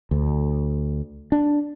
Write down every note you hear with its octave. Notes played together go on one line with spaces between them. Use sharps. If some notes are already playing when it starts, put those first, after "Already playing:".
D2
D4